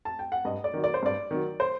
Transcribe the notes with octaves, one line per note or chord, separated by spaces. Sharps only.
A5
G5
F#5
G2 D#5
D5
D#3 F#3
D5
C5
G2 D5
D#3 F#3
C5